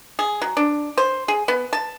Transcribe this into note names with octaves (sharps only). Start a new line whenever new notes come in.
G#4
F#3
D4
C5
G#4
B3
A5